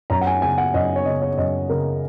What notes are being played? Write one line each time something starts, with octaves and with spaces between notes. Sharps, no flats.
F#2 A#5
F#5
G#5
C#3 G#5
F#5
F#2 D#5
C#5
C#3 D#5
C#5
F#2 D#5
C#3 A#4